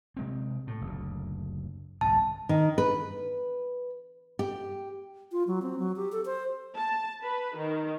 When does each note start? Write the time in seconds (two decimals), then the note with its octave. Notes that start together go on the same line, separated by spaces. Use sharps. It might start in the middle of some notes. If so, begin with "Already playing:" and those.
0.17 C3 G#3 C4
0.67 A2
0.81 F#1 D2
2.01 G1 C2 G#2 A5
2.49 D#3
2.78 B4
4.39 G4
5.32 F4
5.47 F#3
5.62 C4
5.79 F#3
5.96 G4
6.12 A4
6.26 C5
6.76 A5
7.24 B4
7.56 D#3